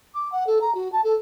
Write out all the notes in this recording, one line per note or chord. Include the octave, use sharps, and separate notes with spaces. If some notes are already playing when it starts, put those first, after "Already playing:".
D6
F#5
A4
A#5
F#4
A5
A4